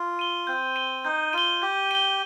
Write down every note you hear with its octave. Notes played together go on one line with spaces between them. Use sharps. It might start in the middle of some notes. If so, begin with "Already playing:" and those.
Already playing: F4
D#7 G7
C4 G6
D#7 G7
D#4 G6
F4 D#7 G7
G4 G6
D#7 G7